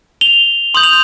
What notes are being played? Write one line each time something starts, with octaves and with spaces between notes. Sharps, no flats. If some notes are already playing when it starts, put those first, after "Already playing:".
F7 G7
C6 D#6 G6 F#7
F7